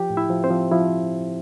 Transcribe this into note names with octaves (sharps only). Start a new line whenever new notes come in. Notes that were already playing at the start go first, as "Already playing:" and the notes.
Already playing: F3 G4 G5
A2
E4 E5
F3
C4 C5
F3
F3 E4